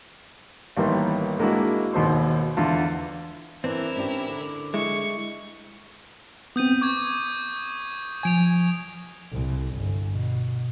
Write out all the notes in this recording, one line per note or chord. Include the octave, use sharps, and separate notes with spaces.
A1 D#3 G3 A#3 B3 C6
G#3 A#3 D4 E4 F#4
G#1 D#2 B2 C5 C6
E2 D3 F4 A5
E3 C4 D4 E4 A#4
C#4 D4 G4
D3
G#3 E4 C#6
B3 C4 D#6 G6 D#7
C#6 D6 G#6
F3 G#5 G#6 D7 F7
C2
G1
B2